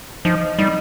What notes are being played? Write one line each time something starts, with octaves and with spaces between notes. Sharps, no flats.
F3 D#4
G3 D#4